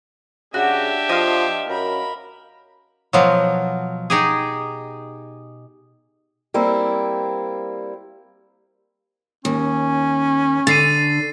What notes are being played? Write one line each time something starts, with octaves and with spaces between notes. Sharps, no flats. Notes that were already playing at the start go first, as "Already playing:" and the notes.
C#3 D4 F#4 G4 E5
F3 D#5 F5
F#2 A#4 B5
B2 F3 F#3
D#4 G4 G#4
G3 A#3 C4 E4
D#2 C#4
D3 A6 C7 D#7